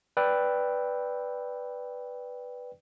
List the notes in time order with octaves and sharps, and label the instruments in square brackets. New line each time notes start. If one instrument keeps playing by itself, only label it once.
[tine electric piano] B4 D5 G5 E6